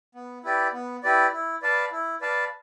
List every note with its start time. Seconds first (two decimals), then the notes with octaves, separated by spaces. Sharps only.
0.15 B3
0.44 E4 G4 B4 D5
0.73 B3
1.03 E4 G4 B4 D5
1.32 E4
1.62 B4 D5 F5 A5
1.92 E4
2.21 B4 D5 F5 A5